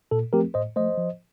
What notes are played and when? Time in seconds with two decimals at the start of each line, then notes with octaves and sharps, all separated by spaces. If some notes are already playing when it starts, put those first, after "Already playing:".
0.11 A#2 A4
0.33 F3 A3 C4 G4 A#4
0.54 A2 C5 D#5
0.76 F3 A3 C5 D#5
0.98 F3